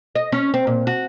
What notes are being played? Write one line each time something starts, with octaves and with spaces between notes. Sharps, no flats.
D#5
C#4
C4
A#2
F#4